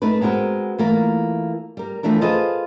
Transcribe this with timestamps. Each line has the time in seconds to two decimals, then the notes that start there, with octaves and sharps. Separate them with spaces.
0.02 A3 D#4 A#4 B4
0.21 G#3 B3 C4 F#4 A#4
0.78 E3 A3 A#3 F4 A#4
1.77 G3 A#4
2.03 E3 F3 A3 D4 A#4
2.21 F4 G#4 A4 B4 C5 D#5